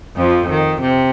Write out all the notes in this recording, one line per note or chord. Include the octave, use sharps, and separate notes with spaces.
F2 F3
D#3
C3